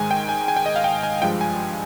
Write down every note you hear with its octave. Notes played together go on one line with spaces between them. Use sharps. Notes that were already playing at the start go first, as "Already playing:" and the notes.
Already playing: G#2 D#3 G#3 G#5
G5
G#5
G#5
G5
D#5
F5
G5
G#5
G2 F3 G#3 G5
G#5